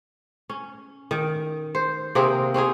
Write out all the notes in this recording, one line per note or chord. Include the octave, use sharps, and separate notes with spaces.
C#4
D#3
C5
C3 A#3 C4 G#4
C4 C#4 D#4 G#4